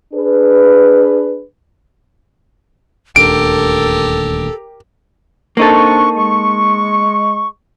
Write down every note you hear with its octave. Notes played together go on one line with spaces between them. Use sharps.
D4 G#4 B4
D#1 D2 D3 G4 A4 A#4 D7
A#3 C4 D4 D#4 A4 C#6
G#3 C#6